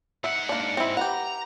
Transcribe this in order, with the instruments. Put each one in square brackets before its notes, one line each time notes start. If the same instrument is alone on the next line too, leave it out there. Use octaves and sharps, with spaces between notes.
[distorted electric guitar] G#2 F#5 [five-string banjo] E5
[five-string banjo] A#3 D4
C4 E4
[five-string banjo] G4 B4 F#5 [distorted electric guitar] A#5